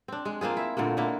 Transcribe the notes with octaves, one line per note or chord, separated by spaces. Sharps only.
C4 D4
G#3
A#3 C4 F4 G#4
E4 E5
A#2 D3 A3 A#3
D3 G#3 A#3 E4